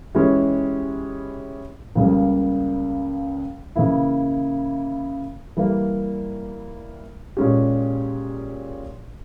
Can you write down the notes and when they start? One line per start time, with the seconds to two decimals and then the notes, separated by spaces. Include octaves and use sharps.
0.15 E3 G#3 C#4 E4 G4
1.95 C#2 C#3 G3 A#3
3.76 C#3 E3 A#3 E4
5.57 E3 G3 A#3
7.37 A#2 G#3 C#4 G4